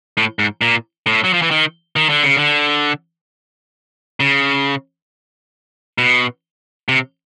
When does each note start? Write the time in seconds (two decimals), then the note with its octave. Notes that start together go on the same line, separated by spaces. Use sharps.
0.17 A2
0.39 G#2
0.61 A#2
1.06 A2
1.24 F#3
1.33 F3
1.42 E3
1.51 D#3
1.96 D#3
2.09 D3
2.23 C#3
2.37 D3
4.20 C#3
5.98 B2
6.89 C3